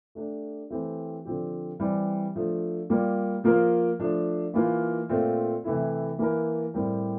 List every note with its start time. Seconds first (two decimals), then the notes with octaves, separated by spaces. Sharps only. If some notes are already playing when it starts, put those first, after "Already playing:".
0.15 A3 D4 G4
0.70 E3 A3 C4 G4
1.25 D3 F3 C4 G4
1.79 E3 G3 C4
2.35 F3 A3 D4
2.90 G3 A#3 F4
3.44 F3 A#3 F4 A#4
3.99 F3 A3 D4
4.54 E3 A#3 F4
5.09 A#2 A3 C4 F4
5.64 C3 E3 A3 E4
6.19 E3 A#3 E4 A#4
6.74 A2 G3 C4 G4 A#4